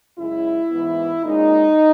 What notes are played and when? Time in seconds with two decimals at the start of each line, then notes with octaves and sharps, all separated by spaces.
0.19 F#2 C#3 G#3 C#4 E4
0.71 G#2 E3 B3
1.24 A#2 G#3 C#4 D#4